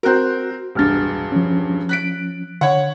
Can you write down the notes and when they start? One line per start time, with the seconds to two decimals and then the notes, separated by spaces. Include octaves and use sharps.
0.03 C4 F#4 A#4 F#6 G6
0.75 E1 C2 G2 F6 A6
1.32 F3 C#4
1.89 F#6 B6 D7
2.61 D3 C#5 F#5